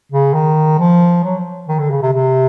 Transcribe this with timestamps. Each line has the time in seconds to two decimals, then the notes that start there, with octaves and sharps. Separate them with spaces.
0.12 C#3
0.34 D#3
0.79 F3
1.24 F#3
1.68 D#3
1.79 D3
1.90 C#3
2.02 C3
2.13 C3